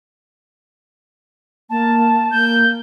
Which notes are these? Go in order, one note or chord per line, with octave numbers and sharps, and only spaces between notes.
A#3 A5
A#3 G6